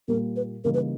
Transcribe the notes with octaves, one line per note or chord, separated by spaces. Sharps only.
A#2 G3 A#3 A#4
B4
C#3 E3 G3 A#3 D#4 A#4
B4